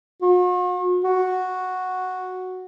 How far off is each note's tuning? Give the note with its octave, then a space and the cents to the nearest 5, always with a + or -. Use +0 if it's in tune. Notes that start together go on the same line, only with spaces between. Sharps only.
F#4 -45
F#4 -5